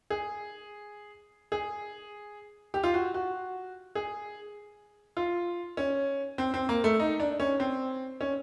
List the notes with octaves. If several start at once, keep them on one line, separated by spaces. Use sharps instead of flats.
G#4
G#4
G4
F4
F#4
F#4
G#4
F4
C#4
C4
C4
A#3
A3
D#4
D4
C#4
C4
C#4